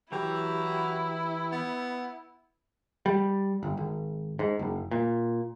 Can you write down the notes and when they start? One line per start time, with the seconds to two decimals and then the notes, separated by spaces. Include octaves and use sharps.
0.12 E3 F#3 E4 G4
1.52 B3
3.06 G3
3.63 G1
3.77 G#1
4.39 G#2
4.59 F#1
4.91 A#2